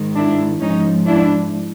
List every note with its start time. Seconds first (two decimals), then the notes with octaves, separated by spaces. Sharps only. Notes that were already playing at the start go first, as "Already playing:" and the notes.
Already playing: G#2 D#3
0.15 D4 E4
0.61 G#2 F3 C#4 D#4
1.06 D4 E4